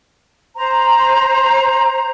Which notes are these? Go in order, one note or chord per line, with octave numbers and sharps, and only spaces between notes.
C5 A#5